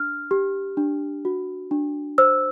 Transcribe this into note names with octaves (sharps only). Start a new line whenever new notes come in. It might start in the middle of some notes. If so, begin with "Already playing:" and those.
Already playing: D4 F6
G4
D4
F#4
D4
C5 E6